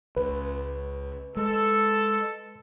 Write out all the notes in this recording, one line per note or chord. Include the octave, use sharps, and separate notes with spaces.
C#2 B4
G#3 A4